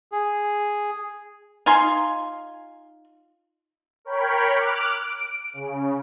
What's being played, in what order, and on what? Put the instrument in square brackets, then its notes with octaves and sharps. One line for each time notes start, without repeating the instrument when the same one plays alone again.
[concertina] G#4
[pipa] D#4 F4 G#5 C6
[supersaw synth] A#4 C#5 G5 B5
D6 F6 F#6
D7
C#3